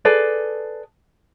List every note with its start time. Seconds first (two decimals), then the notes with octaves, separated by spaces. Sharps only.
0.05 G#4 A4 B4 D5